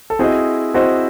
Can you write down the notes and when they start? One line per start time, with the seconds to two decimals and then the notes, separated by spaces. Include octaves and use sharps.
0.10 A4
0.19 C4 E4 F#4 G#4 C5 D#5
0.74 C4 E4 F#4 G#4 C5 D#5